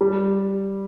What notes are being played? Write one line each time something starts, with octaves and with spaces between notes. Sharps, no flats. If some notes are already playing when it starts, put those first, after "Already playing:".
G3